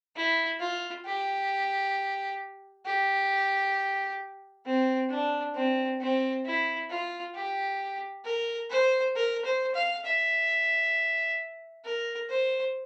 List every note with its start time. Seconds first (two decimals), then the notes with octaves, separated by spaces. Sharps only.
0.16 E4
0.60 F4
1.06 G4
2.86 G4
4.66 C4
5.10 D4
5.55 C4
6.01 C4
6.46 E4
6.91 F4
7.35 G4
8.25 A#4
8.70 C5
9.16 A#4
9.45 C5
9.75 F5
10.05 E5
11.85 A#4
12.30 C5